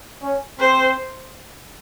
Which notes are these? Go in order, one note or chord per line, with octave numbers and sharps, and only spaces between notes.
C#4
C4 C5